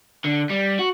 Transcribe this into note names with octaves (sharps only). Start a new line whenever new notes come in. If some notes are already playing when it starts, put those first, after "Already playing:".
D3
G3
F#4